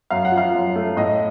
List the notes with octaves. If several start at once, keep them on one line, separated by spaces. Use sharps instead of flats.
F#2 F5
F#5
F3
F5
F#2
A3
A2 D#5